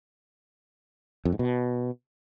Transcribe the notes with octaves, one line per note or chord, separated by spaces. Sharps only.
F2
G#2
B2